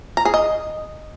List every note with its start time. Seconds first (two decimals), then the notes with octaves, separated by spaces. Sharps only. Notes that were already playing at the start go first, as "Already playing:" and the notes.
0.17 A#5
0.25 G#4
0.34 D#5